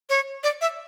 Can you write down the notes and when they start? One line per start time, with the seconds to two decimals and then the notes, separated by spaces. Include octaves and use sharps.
0.09 C#5
0.43 D5
0.61 E5